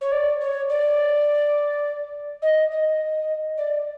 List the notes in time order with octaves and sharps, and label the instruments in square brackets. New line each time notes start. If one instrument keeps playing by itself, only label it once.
[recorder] C#5
D5
C#5
D5
D#5
D#5
D5